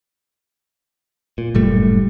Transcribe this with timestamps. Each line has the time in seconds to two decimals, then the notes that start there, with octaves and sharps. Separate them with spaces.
1.38 A#2
1.55 F#1 A2 G3 A3